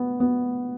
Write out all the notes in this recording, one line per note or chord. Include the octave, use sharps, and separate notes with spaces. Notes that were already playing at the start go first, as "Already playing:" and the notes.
Already playing: B3
B3